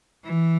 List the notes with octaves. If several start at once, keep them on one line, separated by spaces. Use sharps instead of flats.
E3